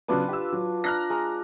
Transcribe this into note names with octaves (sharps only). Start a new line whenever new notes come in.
C#3 F#3 B3 D4 F4 B4
G4 E6
F#3
D4 A#5 F6 F#6 A#6
G#3 A#5